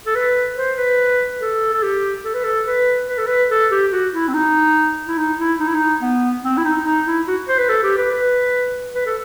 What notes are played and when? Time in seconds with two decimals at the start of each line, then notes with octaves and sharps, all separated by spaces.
0.06 A4
0.15 B4
0.57 C5
0.77 B4
1.41 A4
1.73 A4
1.83 G4
2.24 A4
2.34 B4
2.44 A4
2.66 B4
3.08 B4
3.18 A4
3.26 B4
3.51 A4
3.71 G4
3.92 F#4
4.13 E4
4.28 C4
4.34 D#4
5.08 E4
5.18 D#4
5.38 E4
5.60 D#4
5.67 E4
5.75 D#4
6.01 B3
6.44 C4
6.57 E4
6.64 D#4
6.85 D#4
7.06 E4
7.28 F#4
7.49 C5
7.58 B4
7.69 A4
7.83 G4
7.97 B4
8.11 B4
8.95 B4
9.06 A4